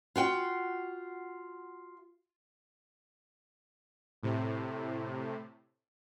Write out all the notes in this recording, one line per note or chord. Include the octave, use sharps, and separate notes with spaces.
F4 F#4 G5
A2 C3